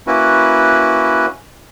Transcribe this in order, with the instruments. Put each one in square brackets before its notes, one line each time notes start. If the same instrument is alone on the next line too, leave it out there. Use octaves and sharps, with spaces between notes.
[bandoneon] A#3 C#4 E4 F#4 B4